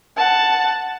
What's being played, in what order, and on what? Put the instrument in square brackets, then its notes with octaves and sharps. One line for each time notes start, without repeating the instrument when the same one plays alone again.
[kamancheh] F#5 A5